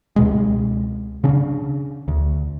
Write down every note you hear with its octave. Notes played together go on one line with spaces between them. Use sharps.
C#2 B2 G#3
C#3 C#4 D4
D2